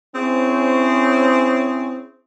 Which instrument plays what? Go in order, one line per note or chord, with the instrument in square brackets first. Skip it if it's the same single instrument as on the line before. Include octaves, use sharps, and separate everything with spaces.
[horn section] C4 C#4 E4 G#4 C5 C#5